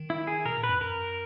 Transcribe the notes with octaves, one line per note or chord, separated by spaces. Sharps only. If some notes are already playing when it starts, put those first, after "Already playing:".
Already playing: D#3
E4
G#4
B2 A#4
A#2
B4
F#2
F#2 A#4